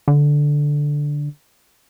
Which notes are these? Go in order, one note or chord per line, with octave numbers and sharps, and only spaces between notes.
D3